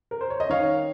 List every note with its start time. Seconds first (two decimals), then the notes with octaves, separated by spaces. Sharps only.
0.11 A#4
0.21 C5
0.30 C#5
0.40 D#5
0.49 D#3 C#5 F5